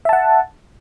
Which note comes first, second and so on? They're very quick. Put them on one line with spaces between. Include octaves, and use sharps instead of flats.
E5 A5 F#5